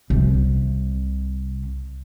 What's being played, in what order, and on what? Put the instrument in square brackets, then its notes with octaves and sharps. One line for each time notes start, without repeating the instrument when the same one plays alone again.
[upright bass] C2 C3